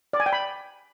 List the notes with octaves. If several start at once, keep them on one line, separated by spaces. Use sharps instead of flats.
D5
G#5
G5
B5